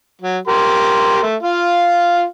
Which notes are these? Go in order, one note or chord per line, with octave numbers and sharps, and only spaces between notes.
F#3
G4 A#4 C6
A3
F4 F5